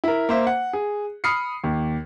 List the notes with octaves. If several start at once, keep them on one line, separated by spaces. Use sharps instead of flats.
E4 A#4
A#3 C5 E5
F#5
G#4
B5 D#6 F6 C7 C#7
D#2